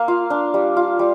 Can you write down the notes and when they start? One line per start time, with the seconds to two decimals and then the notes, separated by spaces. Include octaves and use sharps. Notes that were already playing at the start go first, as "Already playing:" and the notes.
Already playing: A#3 F5
0.08 F4
0.30 D4
0.54 G3
0.77 F4
0.99 G3